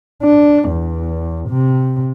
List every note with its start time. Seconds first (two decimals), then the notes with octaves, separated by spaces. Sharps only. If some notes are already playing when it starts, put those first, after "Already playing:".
0.23 D4
0.70 E2
1.49 C3